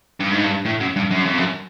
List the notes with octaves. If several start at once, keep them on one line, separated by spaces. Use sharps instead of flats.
G2
G#2
G2
A2
F#2
G2
F#2
F2
F#2